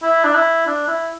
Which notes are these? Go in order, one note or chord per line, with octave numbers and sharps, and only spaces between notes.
E4
D4
E4
D4
E4